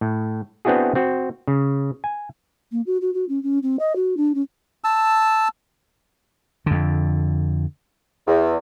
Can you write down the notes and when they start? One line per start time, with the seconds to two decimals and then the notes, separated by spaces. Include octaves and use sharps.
0.01 A2
0.65 B3 C4 D4 E4 F#4 G#4
0.95 C4 F#4
1.47 C#3
2.04 G#5
2.71 A#3
2.86 F#4
3.01 F#4
3.13 F#4
3.28 C#4
3.43 C#4
3.62 C4
3.79 D#5
3.95 F#4
4.17 D4
4.34 C#4
4.84 A5 E6
6.66 F2 D3
8.27 E2